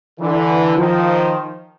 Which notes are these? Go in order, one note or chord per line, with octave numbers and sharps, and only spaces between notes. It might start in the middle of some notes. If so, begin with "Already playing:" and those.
D3 E3
D#3 F3